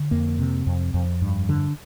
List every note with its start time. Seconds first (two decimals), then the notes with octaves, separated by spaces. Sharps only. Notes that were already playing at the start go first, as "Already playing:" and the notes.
Already playing: D3
0.11 F2 A#3
0.39 C3
0.67 F2
0.94 F2
1.22 G2
1.49 D3